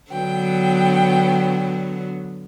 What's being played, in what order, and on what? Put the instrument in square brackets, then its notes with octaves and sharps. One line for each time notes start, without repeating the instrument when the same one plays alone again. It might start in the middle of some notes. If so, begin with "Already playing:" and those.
[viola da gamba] D3 F#3 B3 [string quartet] G5